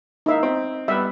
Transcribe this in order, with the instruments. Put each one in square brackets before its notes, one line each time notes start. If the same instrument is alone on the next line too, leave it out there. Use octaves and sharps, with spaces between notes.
[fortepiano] A#3 E4 F5 [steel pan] D#4 E5
[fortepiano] C4
[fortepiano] G3 B3 B4 [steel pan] E5